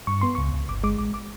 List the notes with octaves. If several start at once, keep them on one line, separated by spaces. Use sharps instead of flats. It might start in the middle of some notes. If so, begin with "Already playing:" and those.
G2 C#6
B3 C6
C#2 C#6
C#2
G1 D6
G#3 D6
A1 D6
D6